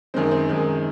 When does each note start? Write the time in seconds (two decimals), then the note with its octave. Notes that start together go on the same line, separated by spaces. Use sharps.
0.14 F#2 D#3 G#3 C4
0.31 C4
0.49 F#2 D#3 G#3